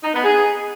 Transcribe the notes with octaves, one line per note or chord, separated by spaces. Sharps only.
D#4
B3
G#4